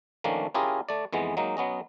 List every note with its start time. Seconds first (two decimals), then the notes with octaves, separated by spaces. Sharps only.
0.24 D#3 F3 A3 A#3 C#4 D4
0.54 C#4 E4 F4 G4 G#4 A#4
0.89 A3 D5
1.13 F2 E3 G#3 B3
1.37 F#3 G#3 A#3 D#4
1.57 F#3 B3 C#4 D#5